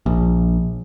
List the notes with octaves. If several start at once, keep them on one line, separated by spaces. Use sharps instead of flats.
A#1